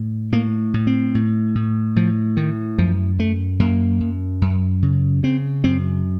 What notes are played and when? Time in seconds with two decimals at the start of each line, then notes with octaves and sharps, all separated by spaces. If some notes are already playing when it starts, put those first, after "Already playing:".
Already playing: A2
0.32 A2 A#3
0.74 A2
0.87 C4
1.15 A2
1.55 A2
1.96 A2 F3
2.37 A2 D#3
2.78 F#2 F3
3.19 F#2 A3
3.59 F#2 A#3
4.01 F#2
4.42 F#2
4.83 C#3
5.23 C#3 C4
5.64 F#2 C4